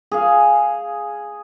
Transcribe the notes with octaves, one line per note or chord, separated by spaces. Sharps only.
G#4 F5